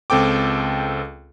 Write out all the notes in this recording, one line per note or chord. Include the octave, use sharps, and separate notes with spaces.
C#2 C4 A4 G5 D6